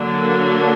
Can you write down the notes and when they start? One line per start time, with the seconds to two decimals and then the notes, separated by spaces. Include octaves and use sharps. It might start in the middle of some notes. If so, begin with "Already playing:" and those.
Already playing: D3 F#3 A#3 D4